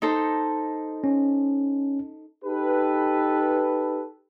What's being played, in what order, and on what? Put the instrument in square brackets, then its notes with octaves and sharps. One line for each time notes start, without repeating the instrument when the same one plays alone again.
[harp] D#4 A4 C5
[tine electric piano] C#4
[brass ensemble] D#4 G4 A4 B4